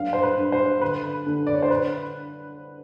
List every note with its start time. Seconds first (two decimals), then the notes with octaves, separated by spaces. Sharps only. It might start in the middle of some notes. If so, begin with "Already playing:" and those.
Already playing: G2 F#3 F5
0.13 C5
0.23 B4
0.38 G2
0.52 C5
0.81 D3 B4
1.26 D3
1.47 D5
1.54 C#5
1.62 C5
1.70 B4